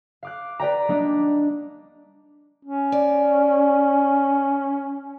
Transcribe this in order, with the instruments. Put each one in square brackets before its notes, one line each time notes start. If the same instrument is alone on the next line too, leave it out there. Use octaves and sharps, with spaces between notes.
[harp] F5 D6 F#6
B4 D5 G5 A#5
G3 A#3 D4 D#5
[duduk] C#4
[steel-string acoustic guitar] D5